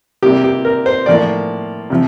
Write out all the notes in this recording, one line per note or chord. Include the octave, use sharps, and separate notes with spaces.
C3 G3 A#3 G4
G4
A#4
C5
A2 F3 A#3 D5
C3 F3